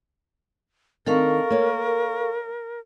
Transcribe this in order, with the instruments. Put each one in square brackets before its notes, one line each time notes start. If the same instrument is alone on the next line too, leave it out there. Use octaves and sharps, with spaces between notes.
[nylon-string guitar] D#3 C4 D4 [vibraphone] A4 F5 C#6 [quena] A#4
[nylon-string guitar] A#3 C#5